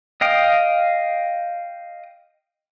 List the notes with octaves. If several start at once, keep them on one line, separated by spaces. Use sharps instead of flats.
D#5 F5 G5 D#6